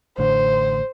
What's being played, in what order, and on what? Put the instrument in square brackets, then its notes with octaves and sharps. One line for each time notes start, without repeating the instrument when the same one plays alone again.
[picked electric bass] A1 A2 D3 [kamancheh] C5